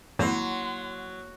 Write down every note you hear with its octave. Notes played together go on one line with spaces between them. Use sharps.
G#1 F2 F#3 A#3 E4 F#5 C6